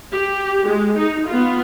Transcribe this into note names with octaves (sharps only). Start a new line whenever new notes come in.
G4
G#3
D#4
B3 F4